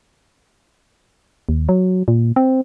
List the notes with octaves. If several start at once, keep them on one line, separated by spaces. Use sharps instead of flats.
D#2
F#3
A#2
C4